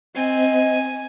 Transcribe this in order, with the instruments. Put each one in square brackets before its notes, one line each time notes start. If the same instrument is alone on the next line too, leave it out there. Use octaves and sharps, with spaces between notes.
[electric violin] C4 [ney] D#5 [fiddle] G#5